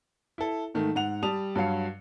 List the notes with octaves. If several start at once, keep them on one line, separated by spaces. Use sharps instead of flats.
E4 A4
G#2 D#3 A3
G#2 F#5 F7
G3 A5 D#6 F7
G2 F#3 F5 C#7